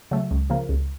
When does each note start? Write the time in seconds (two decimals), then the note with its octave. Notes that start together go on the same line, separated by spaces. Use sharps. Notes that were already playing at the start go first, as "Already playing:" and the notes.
0.11 C#3 F#3 A3
0.31 C#2
0.50 C#3 F3 A#3
0.69 C#2